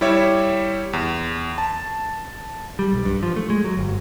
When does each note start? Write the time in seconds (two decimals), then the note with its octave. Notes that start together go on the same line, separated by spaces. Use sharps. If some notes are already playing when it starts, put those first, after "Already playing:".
0.01 G3 E4 G4 C#5 E5
0.93 E2
1.58 A5
2.79 G3
2.92 B1
3.05 G2
3.23 F3
3.36 A3
3.50 G#3
3.64 F#3
3.77 G1